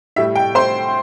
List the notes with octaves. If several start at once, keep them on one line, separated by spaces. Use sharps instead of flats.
A2 G3 E5
G5
C5 C6